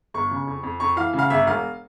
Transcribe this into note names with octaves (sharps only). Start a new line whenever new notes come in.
G1 C#6
C#3
F2
F2
F2 C#6
E3 F5
C#3
F5
G1 E5
E1 F5